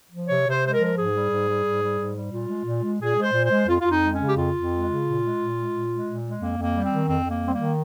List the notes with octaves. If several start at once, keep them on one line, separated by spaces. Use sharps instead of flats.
F3
C3 C#5
C3
C5
G#3
C5
A#4
F3
A#4
G#2 G#4
G3
G#2
G3
G#2
G3
G#2
G3
A#2 F4
G#3
A#2
G#3
A#2 G#4
G#3
C5
A#2
C5
G#3
F2 F4
F4
F2
D#4
G#3
C#4
C#3
G4
F2 F4
F2
G#3
C#3
A#2
G#3
A#2
G#3
A#2
G#3
A#2
G#3
F2 A#3
F2 A#3
G3
C4
D#3
F2 C4
F2
A#3
G3
C4
D#3 A#3